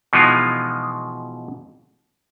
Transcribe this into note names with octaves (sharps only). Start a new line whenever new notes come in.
B2 E3 F3 G#3 D#4 F4